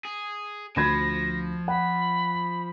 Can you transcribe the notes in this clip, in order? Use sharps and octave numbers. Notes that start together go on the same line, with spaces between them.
G#4
D2 F3 B5 G#6 A#6
F#5 B5